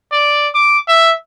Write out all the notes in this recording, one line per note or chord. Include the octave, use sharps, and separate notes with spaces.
D5
D6
E5